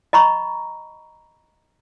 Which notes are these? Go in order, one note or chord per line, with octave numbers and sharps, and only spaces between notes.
D#5 A#5 B5 C#6